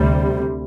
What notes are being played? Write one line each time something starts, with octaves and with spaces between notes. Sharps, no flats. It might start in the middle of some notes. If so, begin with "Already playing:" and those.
Already playing: D2 C3 G3